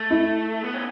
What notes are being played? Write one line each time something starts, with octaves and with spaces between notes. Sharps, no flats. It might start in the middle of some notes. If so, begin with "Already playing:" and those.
Already playing: A3
E4
B3
C#4